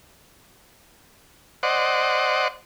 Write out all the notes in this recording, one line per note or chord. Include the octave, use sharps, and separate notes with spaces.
C5 D5 D#5 F#5